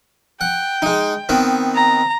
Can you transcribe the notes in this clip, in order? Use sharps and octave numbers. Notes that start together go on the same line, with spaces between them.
F#5 G5
G#3 D#4
D#3 B3 C4
A#5